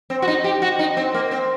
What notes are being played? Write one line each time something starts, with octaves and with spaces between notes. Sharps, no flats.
C4
F#4
D#4
G4
F#4
D#4
C4
A#3
C4